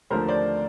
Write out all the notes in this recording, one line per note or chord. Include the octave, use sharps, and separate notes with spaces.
D#2 D3 F3 A3 A#4 C5
C5 D5